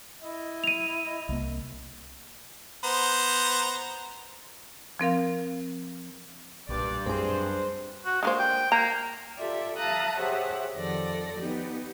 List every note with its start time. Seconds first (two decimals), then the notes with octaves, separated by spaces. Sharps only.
0.22 E4 D#5
0.64 D#7 F7
1.29 C2 A#3
2.84 B3 C5 A#5
4.99 F3 C4 A#4 F5
6.69 B1 G2 A#2 D5
7.06 F#2 C4 G#4 C5
8.06 F#4
8.23 D3 G#3 A#3 C5
8.39 G5
8.72 A#3 A#5
9.38 F4 G4 A4 D5 E5
9.77 E5 F5 A5 A#5 D#6 F#6
10.18 G4 G#4 C5 C#5 E5 F#5
10.76 F2 D#3 F3 A4 D5 A#6
11.37 B3 D#4 G4